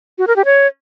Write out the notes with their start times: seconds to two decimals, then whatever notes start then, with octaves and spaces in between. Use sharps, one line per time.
0.18 F#4
0.27 A#4
0.36 G4
0.45 C#5